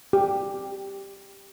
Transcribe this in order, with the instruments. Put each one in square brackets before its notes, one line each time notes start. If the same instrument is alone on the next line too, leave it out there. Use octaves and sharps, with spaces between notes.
[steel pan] G4